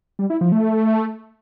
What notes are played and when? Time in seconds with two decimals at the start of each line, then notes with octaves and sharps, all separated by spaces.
0.19 G3
0.30 E4
0.41 F3
0.52 A3